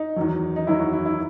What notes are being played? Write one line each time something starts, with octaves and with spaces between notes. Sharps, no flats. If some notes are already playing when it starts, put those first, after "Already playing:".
Already playing: D#4
E2 D#3 F#3
D#4
E2 D#3 F#3 E4
F#4
E4
E4